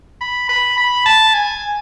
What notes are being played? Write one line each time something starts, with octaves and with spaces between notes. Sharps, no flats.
B5
B5
B5
A5
G#5